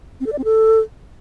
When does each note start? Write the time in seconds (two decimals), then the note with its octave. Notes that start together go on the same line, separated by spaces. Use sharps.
0.20 C4
0.26 A4
0.32 D5
0.38 C4
0.44 A4